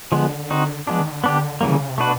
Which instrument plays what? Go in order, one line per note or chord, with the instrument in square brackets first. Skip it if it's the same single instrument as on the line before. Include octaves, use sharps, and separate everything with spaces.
[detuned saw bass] D3 [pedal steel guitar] F3 G#3 B3
[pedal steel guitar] C4 D#4 F#4
[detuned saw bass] F3 [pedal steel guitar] G#3 B3 D4
[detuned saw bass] D#3
D3
[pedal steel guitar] B3 D4 G4
[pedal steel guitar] C#3 E3 G3 A#3 [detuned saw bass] F#3
[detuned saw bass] D3
C#3
C3
[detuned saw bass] B2 [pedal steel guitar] A3 D4 F#4 B4